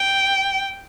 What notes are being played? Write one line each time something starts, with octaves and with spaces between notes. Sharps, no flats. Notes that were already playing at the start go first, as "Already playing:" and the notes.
Already playing: G5